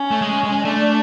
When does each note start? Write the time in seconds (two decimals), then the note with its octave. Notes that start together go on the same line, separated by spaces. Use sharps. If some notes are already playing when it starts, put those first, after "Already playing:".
Already playing: C#4
0.11 A3
0.22 G#3
0.44 G#3
0.64 A3 D4